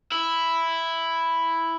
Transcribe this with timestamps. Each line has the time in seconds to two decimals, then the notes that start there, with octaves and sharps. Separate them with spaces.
0.12 E4